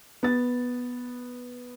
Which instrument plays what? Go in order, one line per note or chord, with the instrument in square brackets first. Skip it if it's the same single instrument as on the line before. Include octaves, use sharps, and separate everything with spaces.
[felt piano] B3 A6